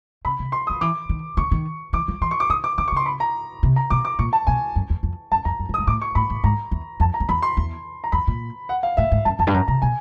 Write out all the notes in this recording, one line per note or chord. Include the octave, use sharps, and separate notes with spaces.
C#3 B5
C3
C6
D#6
F3
E3 D6
D#3
D3 C#6
D#3
E3 D6
F3
E3 C6
C#6
D6
D#3 D#6
D6
D3 D6
C#6
C#3 C6
B5
A#5
C3
A#5
B2 D6
D6
A#2 C#6
A5
B2 G#5
F#2
E2
F2
F#2 A5
F2 A#5
F#2
G2
D#6
G#2
A2 D6
C#6
A2 B5
A2
G#2 A#5
E2
F2 A5
A#5
F2
E2 B5
C6
E2
A#5
F2 B5
A#2
F#5
F5
A2 E5
G#2
F#2 A5
F2 A5
G2
F#2 A#5
C3 A#5
B2 G#5